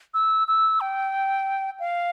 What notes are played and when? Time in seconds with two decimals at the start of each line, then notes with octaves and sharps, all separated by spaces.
0.14 E6
0.48 E6
0.81 G5
1.80 F5